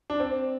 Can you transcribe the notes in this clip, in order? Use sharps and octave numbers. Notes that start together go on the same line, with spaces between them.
D4
C4